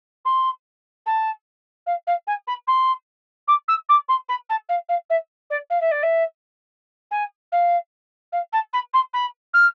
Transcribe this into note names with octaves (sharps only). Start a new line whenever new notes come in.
C6
A5
F5
F5
G#5
B5
C6
D6
E6
D6
C6
B5
A5
F5
F5
E5
D5
F5
E5
D5
E5
G#5
F5
F5
A5
B5
C6
B5
F6